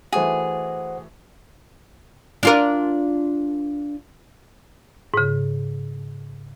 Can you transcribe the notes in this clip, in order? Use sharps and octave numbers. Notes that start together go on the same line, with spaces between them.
E3 A3 F#4 G#4 C5 F#5
D4 F4 A#4
G#2 C#3